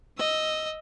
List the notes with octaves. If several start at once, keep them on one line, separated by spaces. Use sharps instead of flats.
D#5 E6